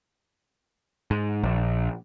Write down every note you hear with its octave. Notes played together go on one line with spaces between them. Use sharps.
G#2
A#1